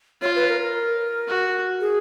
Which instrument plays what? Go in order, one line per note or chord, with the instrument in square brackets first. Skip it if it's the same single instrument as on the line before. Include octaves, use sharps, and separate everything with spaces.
[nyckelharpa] F4 [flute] C#5
[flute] B4
A#4
A#4
[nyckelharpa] F#4
[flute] G#4